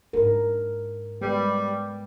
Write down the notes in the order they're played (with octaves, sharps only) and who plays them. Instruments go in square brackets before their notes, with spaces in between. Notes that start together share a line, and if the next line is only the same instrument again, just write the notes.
[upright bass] G#2 D4 [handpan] A#4
[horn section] G3 [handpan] G#3 B3 B4